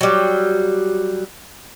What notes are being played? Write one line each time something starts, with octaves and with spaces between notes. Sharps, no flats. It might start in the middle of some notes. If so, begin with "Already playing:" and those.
F#3 G3